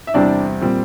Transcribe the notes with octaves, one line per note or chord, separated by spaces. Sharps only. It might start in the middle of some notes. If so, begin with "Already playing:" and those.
E5
E2 C3 G3 C4 D4 D5
A#2 G3 C4